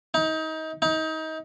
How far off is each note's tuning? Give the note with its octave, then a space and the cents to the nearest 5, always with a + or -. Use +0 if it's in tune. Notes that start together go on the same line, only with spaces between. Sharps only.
D#4 +30
D#4 +30